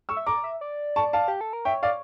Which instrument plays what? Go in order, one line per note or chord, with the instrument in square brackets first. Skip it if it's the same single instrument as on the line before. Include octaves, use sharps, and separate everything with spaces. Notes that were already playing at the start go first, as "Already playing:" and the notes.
[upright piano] C#6 E6
[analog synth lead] E5
[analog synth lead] D5 [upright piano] A#5 D6
[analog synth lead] E5
D5
[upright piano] A5 C#6
F5 A5
[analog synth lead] G4
A4
A#4
[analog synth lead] C#5 [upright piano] E5 G5
[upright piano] D5 F5